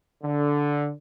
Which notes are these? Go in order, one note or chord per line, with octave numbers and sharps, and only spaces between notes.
D3